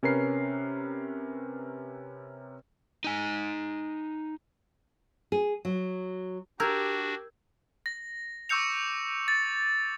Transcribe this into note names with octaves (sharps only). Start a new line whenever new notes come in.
C3 C#4 A#4 B4 C7
D#4 G#5
G#4
F#3
D4 F#4 G4 A#4 E6 G6 G#6
A#6
C#6 D6 E6 G6 C#7 F7
A6